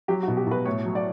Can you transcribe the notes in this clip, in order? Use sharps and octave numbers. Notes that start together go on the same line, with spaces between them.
F#3 G4
F#4
B2
G4
B2 B4
A2 C#5
F#3
D5